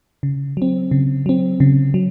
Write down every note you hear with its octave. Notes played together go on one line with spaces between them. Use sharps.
C#3
F#3 C4
C#3
F#3 C4
C#3
F#3